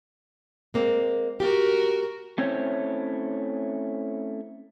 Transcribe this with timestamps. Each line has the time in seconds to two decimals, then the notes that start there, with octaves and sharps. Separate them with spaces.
0.74 G#3 A#3 C4
1.40 F#4 G4 A#4
2.38 A3 C4 C#4 E4 C5 C#5